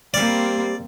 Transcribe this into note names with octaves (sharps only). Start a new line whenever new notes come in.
G3 A#3 C4 C5 D5 F5